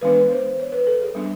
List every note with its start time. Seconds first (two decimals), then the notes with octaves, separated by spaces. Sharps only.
0.01 E3 G#3 B3 D4 B4
0.31 C5
0.59 C#5
0.72 B4
0.87 A4
1.02 G#4
1.15 G3 B3 D4